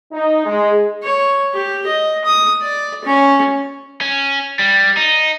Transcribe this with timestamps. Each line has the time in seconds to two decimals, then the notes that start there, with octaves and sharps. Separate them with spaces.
0.12 D#4
0.46 G#3
1.03 C#5
1.54 G4
1.86 D#5
2.25 D#6
2.61 D5
3.05 C#4
4.01 C#4
4.59 G3
4.97 D#4